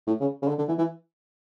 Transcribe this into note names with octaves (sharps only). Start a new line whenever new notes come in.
A2
C#3
C#3
D3
D3
E3
E3